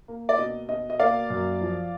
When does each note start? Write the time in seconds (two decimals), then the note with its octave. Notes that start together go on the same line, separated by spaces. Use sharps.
0.08 A#3
0.29 D5
0.38 B2 D#5
0.69 B2 D#5
0.90 D#5
0.99 A#3 D5 F5
1.30 F#2
1.61 F3